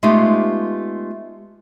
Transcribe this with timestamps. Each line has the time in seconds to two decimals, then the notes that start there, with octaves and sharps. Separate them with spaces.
0.03 G#3 A3 B3 D#4 F4 G4